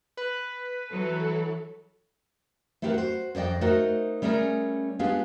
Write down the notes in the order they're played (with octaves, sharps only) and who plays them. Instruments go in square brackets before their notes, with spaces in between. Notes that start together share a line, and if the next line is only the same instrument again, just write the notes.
[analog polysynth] B4
[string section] E3 A4 [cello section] F#3
[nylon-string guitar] A3 C4 E4 G4 A#4 B4
F#4 C5
F2 C5 D5 D#5 G5
A3 D#4 F#4 A#4 C5 D#5
G3 A3 C#4 G#4 A#4
G#3 B3 D4 F4 G4 G#4